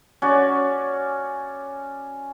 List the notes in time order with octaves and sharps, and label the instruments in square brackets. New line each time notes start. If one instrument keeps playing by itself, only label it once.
[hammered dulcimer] C#4 F#4 D5